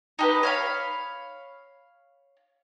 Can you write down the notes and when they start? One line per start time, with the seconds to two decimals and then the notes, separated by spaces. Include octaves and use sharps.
0.19 D#4 G4 B4
0.43 C#5 F5 B5